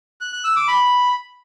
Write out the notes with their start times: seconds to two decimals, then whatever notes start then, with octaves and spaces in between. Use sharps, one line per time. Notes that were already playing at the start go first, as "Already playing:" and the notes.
0.21 F#6
0.33 F#6
0.44 E6
0.56 D6
0.68 B5